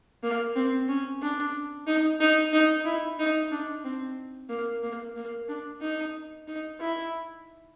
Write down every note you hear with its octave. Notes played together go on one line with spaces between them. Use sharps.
A#3
C4
C#4
D4
D#4
D#4
D#4
E4
D#4
D4
C4
A#3
A#3
A#3
D4
D#4
D#4
E4